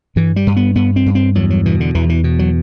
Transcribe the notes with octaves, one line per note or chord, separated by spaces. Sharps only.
G2 E3
G3
G2
B3
G2 B3
C4
G2
C4
E2 F#3
F#3
B2 E3
D3
E2 E3
E3
B2
F#3